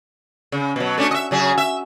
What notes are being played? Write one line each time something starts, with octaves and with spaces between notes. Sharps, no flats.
C#3
B2 F#3
A3 C#4 D4
D#5 E5
C#3 F#3 G#4
E5